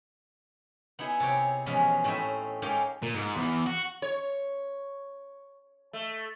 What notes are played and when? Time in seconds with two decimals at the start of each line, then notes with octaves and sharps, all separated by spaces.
0.99 B3 D#4 E4 G#4
1.20 C3 G#4 C#5 G5
1.66 E2 B2 F3 G#3 C#4
2.04 A2 C4 C#4 D#4 E5
2.62 G#3 A#3 C#4 D#4 G4 A4
3.03 A#2
3.15 G#2
3.36 E2
3.66 F#4
4.02 C#5
5.93 A3